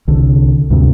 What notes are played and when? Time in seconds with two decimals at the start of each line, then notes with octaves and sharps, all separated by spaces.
0.08 C2 D3
0.70 D2 G2 C3